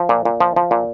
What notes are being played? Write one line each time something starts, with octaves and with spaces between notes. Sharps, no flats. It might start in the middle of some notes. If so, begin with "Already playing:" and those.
Already playing: F3
A#2
A#2
F3
F3
A#2